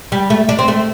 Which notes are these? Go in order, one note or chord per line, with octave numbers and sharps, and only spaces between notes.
G3
A3
D4
C4
A3